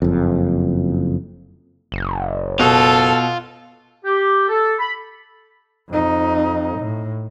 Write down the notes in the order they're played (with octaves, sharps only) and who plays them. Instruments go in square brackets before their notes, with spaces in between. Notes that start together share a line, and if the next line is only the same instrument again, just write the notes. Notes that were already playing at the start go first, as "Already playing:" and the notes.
[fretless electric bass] F#1 F2
[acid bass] F#1
[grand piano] B2 [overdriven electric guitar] F4 [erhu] A4
[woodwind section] G4
A4
B5
[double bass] F2 D#4
A2